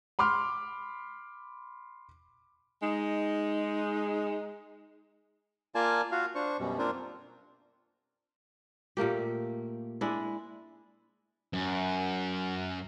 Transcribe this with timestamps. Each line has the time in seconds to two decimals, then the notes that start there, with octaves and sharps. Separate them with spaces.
0.19 B5 C6 D6 F6
2.83 G#3 D#4
5.75 A#3 F4 A#4 D5 G#5 A5
6.12 F4 F#4 F5
6.35 D4 C5 C#6
6.59 F#2 B2 G3
6.79 A#3 C4 D4 F4 A#4 C5
8.97 A#2 A3 A#3 G4
10.01 G#3 D4 E4
11.53 F#2